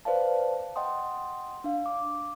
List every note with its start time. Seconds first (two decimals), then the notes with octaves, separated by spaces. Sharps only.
0.05 B4 C5 D5 F5 A5
0.76 D#5 F#5 G5 C6 D#6
1.64 D4 F5
1.86 D6